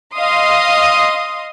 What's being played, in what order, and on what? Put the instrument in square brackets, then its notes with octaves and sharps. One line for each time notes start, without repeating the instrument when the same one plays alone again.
[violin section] D#5 F5 C6 D#6